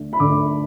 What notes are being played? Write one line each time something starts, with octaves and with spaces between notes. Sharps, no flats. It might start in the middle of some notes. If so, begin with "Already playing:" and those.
Already playing: D2 D3 A3
B5
D2 D3 A3 D6